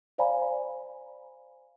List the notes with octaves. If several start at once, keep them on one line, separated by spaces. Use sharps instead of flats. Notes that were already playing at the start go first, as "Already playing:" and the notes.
C5 D5 F5 G#5 A#5 B5